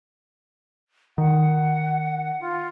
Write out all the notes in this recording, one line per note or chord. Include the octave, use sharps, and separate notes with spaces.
D#3 F#5
F4